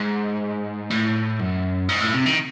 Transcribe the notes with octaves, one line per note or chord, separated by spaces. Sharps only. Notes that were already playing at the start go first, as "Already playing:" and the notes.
Already playing: G#2
A2
F#2
G#2
A2
C3
D#3